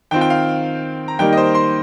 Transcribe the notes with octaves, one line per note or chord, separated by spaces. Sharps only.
D#3 C4 F4 G5
G5
F5
A#5
D#3 G3 A#3 D#4 G5
D#5
C5
C6